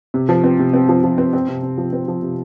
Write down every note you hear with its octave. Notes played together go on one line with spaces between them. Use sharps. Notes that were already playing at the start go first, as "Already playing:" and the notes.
C3
F3
C4
C3
C4
F3
F3
C4
C4
C3
C3
F3
C4
F3
C3